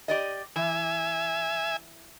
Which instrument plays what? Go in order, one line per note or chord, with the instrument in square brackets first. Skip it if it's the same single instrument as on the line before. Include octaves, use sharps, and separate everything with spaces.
[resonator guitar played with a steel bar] G4 D5 D#5
[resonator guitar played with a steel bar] E3 [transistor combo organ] E5 G#5